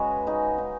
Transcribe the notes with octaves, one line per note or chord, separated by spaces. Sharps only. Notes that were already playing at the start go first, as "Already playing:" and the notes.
Already playing: C#3 G#3 F#4 G#4 B4 C#5 D#5
C#3 D#4 G#4
D#4